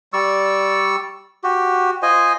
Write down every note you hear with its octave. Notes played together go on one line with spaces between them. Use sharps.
G3 D5 C#6 E6
F#4 G4
F4 C5 D#5 G#5